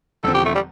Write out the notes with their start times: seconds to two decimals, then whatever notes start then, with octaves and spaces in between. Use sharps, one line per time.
0.24 E1 E2 D3 F3 C4 A4
0.34 G4
0.45 A3
0.55 G3